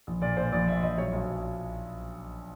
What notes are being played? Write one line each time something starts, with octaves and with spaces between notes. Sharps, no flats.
A#1
A#2 D5
A#2 C5
A#1 D5
A#2 E5
A#1 D#5
F#3 C#5
B1